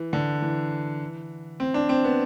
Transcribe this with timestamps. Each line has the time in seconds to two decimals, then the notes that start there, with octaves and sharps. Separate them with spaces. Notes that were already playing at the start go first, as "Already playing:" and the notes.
Already playing: E3
0.13 D3
0.42 E3
1.60 C4
1.74 D4
1.89 C4
2.04 B3